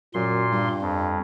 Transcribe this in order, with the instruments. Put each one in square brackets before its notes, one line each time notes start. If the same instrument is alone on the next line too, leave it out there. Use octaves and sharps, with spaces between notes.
[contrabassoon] F#2 [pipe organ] A#2 C6
[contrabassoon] G2
[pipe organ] F2